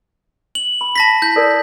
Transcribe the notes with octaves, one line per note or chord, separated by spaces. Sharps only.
F#7
B5
A5 B5 A#6 B6
E4 G6
A4 A#4 D5